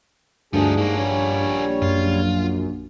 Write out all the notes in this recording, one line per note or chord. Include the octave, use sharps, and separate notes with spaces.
D2 G2 F3 D4 D#4 G#4
G#2 A#3 C#4
A#1 G3 C#5
F#2 F4